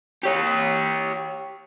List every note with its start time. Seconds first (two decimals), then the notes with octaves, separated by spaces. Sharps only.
0.23 G4 C#5